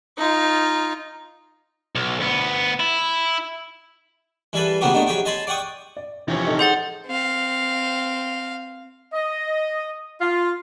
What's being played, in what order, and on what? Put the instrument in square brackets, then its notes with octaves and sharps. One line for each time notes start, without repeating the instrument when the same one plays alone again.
[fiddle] D#4 F4
[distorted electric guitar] B1
D2 B3
E4
[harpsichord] E3 G3 G#4 A4 B4
A2 C#3 A#3 B3 F#4 G4
A3 B3 D4 D#4
F#3 G4 G#4 G5
D#5 G#5 A5 B5 C6
D5 F#5 G5 C#6 D#6
[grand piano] D5
[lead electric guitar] C3 C#4 [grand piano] E3 F3
[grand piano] D#4 A4
[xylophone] G#4 F#5 A6 [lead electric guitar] C5
[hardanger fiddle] C4 F5
[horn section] D#5
F4